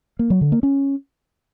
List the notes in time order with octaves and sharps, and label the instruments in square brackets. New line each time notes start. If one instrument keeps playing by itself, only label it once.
[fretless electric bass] A#3
F#3
D3
A#3
C#4